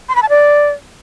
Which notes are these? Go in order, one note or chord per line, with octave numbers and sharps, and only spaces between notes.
C6
B5
A5
D5